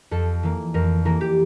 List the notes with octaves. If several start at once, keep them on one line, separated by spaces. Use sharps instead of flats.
F2 A4
E3 A#3
F2 A#4
E3 A#3 A#4
G4